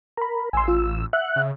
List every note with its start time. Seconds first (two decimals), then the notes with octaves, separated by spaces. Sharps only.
0.17 A#4 A#5 B5
0.53 A1 G#5 C6 E6
0.68 F4
1.13 E5 F#5 F#6
1.36 C#3